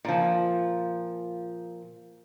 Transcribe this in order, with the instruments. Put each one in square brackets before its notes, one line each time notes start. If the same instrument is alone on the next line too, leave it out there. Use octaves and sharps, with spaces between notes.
[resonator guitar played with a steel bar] A#2 F3